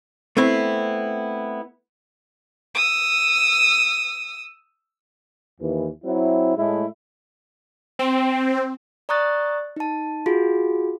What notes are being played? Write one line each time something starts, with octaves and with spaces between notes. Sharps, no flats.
A3 B3 C4 E4
D#6 E6
D#2 E3
F#3 C4 E4
A2 G#3 A3 E4
C4
D5 A#5 C#6 D#6 F#6 A6
D#4 A5
F4 F#4 G#4